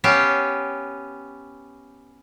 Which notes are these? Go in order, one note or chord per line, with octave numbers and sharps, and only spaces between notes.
B3 C#4 G4 E5 F5 G5